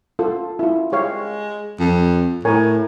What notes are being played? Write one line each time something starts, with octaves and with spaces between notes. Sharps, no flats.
F4 A4
E4 F4
G#3 G4 C#5 F5
F2
A2 A#4 C#5 G#5